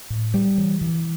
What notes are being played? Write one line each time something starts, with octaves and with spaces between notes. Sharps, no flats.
A2
G3
E3
E3